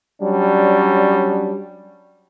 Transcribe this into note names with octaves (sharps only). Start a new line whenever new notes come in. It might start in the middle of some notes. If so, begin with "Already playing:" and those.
F#3 G3 C#4 D4